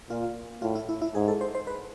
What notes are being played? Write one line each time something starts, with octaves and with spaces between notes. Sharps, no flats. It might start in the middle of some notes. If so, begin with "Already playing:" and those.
A#2 F4
A2 F4
E4
E4
E4
G#2 G#4
A4
C5
C5
B4